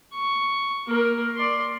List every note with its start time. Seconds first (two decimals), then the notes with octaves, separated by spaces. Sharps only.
0.13 C#6
0.87 A#3 A#4
1.36 D5 C6